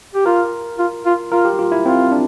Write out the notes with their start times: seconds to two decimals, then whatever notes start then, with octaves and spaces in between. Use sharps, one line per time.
0.15 G4
0.26 F4 A#4
0.79 F4
1.06 F4
1.32 F4 A#4
1.45 G4
1.59 F4
1.72 E4
1.85 C4 F4
2.12 D4